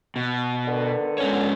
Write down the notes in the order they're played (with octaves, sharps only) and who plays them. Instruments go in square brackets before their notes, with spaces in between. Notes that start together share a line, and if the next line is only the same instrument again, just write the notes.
[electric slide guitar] B2
[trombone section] D3 D#3 B3
[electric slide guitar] G#2 C#4 C#5